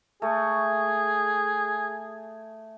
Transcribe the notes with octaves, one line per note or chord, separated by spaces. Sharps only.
A3 G#4